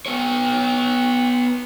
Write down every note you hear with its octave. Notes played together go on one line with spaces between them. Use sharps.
B3 C#5